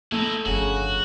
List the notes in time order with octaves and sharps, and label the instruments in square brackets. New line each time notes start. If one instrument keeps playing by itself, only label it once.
[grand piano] A3 [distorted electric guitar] D#4 E4
[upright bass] G1 F2 [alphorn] C#3 [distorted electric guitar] F#4